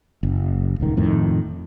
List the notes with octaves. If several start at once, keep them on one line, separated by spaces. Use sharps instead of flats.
F#1
D#1 C#2 D#3
F2 A2 D#3